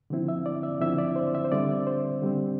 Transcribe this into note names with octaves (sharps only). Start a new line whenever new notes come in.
D3 F3 C4 E4
E5
D5
E5
D3 F3 C4 E4 E5
D5
C5
E5
C5
D3 G3 C4 D5
C5
D3 G3 C4